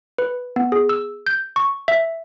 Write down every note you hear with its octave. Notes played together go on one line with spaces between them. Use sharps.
B4
B3
G#4
E6
G6
C#6
E5